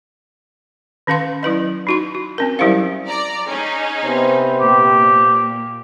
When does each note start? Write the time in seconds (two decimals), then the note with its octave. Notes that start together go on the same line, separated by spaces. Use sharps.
1.07 D#3 C#4 B4 F5 C6
1.43 F#3 E4 B4 D#5
1.87 D#4 F#4 C6
2.15 F#4
2.38 C4 C#4 A#4
2.59 F#3 G3 E4 G4 C5 F5
3.07 D5 A#5
3.49 C#4 D#4 G#4
4.04 C3 B3 C5
4.60 A#2 A#3 G4